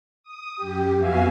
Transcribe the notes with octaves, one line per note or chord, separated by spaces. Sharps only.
D#6
F#2 G4
F2 B3 F#4 E5 F5 G#5